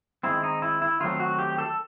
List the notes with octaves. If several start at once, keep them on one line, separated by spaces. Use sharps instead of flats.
D#3 G#3 C4 E4
D#4
E4
E4
D#3 F#3 A3 C4 F4
F#4
G4
A4